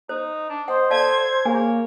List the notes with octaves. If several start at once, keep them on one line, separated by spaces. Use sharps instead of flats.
D#4 C5
D4
C5 D#5 F#5
A4 D5 F5 A5 G#6
A#3 G#4 C#5 G#5